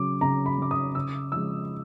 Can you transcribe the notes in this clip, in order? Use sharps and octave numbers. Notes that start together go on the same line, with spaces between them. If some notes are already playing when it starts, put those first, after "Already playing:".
Already playing: C#3 F#3 D6
C#3 A#5
B5
F#3 D6
D#6
C#3 E6
F3 G#3 E6